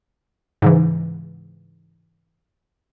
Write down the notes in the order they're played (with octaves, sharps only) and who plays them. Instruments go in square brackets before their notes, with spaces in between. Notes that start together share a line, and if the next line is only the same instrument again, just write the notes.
[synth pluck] G#2 C#3 E3